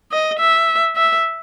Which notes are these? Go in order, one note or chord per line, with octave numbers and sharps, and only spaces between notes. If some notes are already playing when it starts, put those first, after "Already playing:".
D#5
E5
E5